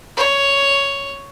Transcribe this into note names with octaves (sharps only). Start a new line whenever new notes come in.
C#5